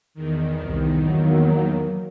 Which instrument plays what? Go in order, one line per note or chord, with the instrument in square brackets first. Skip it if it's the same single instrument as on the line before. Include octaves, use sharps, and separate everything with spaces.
[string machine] E2 D#3
[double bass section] C2
F#3 A#3